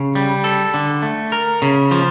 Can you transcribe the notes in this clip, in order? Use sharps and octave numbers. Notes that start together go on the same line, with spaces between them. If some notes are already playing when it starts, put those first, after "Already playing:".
Already playing: C#3
G3
A4
D3
A3
A#4
C#3
F3